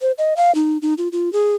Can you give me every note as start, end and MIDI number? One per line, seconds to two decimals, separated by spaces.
0.01 0.12 72
0.18 0.34 75
0.37 0.54 77
0.55 0.78 63
0.82 0.94 63
0.98 1.08 65
1.12 1.32 65
1.33 1.55 68